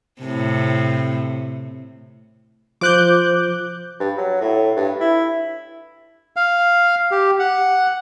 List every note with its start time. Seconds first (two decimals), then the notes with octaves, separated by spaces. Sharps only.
0.21 A2 C3
2.81 F3 F4 C5 D6 F#6 G6
4.00 G2
4.18 F#3
4.41 A2
4.76 G2
5.01 E4
6.36 F5
7.11 G4
7.40 F#5